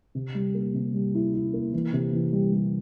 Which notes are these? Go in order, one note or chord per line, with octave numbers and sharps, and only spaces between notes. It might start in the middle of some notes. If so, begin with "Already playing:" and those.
C3
G3
A#3
C3
G3
E4
E4
A#3
E3
C3
E3
G3
G3